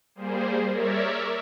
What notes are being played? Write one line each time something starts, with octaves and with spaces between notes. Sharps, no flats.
G3 A#3 G#4 C5
A#4 C#5 D5 E5